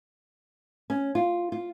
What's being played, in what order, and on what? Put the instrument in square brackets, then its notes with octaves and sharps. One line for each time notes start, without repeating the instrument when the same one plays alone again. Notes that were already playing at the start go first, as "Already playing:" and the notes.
[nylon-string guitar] C#4
F4
F4